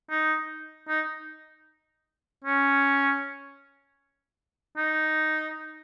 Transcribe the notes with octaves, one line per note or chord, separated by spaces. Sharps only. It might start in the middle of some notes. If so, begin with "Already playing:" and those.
D#4
D#4
C#4
D#4